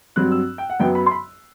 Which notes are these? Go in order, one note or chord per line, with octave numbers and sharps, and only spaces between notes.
G2 F#3 C4 F#6
E6
G5
F#5
F#2 F#3 B3 G5
B5
C6
B5